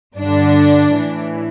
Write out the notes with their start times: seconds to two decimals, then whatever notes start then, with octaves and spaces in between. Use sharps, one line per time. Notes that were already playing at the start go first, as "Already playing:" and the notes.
0.17 G2 D3 D4
0.93 A2 E3